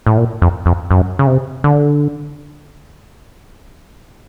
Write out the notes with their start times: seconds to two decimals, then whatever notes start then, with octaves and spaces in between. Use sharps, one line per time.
0.06 A2
0.17 A#2
0.42 F2
0.66 F2
0.91 F#2
1.19 C#3
1.27 C3
1.64 D3